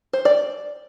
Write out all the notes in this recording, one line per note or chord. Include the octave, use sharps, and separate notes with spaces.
C5
D5